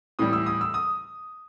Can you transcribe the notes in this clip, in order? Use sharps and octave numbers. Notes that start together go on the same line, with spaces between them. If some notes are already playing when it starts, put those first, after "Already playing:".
A2 E3 G3 D#6
E6
D#6
E6
D#6